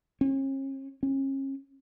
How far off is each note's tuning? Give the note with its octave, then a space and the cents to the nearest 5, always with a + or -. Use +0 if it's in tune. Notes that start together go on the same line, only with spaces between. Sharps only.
C#4 -40
C#4 -35